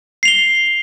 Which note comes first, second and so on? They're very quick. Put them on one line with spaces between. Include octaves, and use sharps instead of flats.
C7 F7 G7